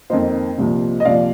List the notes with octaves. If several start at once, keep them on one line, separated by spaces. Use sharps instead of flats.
F2 D#3 A#3 C5 D#5
C2 A#2 F3
D#5
C2 A#2 F3 D5 F5